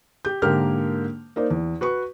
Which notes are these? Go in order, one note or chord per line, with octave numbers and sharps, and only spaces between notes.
G4 G6
G#2 D3 A#3 G4 A#4 F6
A#3 D#4 C5 D5
E2
F#4 B4 C#6